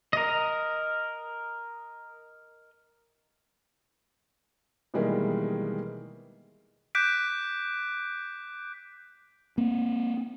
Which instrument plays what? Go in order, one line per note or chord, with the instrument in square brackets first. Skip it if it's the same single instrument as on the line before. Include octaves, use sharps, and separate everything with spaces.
[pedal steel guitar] A#4 D#5
[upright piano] B2 D#3 E3 G3 G#3 A#3
[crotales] D6 F#6 G6 B6 D7
[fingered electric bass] A#3 C4